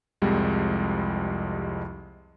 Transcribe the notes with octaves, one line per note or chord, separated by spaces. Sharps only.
C2 F2 G3 G#3